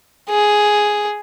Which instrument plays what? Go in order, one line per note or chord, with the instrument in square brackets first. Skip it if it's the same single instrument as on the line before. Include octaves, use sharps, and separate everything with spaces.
[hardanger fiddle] G#4